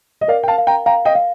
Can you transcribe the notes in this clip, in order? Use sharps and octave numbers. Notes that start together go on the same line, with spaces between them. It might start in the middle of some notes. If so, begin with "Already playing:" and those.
D#5
A#4 D5 F5
G5
F5 A5
F5
G5 A#5
F5 G5 A#5
D#5 G5
F5